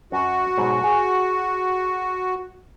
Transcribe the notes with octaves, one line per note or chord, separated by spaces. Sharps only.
F#2 F#4
G#2 B2 F#3
G#4